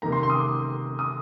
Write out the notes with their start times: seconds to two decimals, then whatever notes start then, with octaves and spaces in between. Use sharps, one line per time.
0.02 C3 D#3 A#3 A#5
0.12 C6
0.23 C6
0.30 D#6
0.35 D6
0.99 D#6